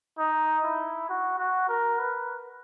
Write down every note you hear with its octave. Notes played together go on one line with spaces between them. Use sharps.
D#4
E4
F#4
F#4
A#4
B4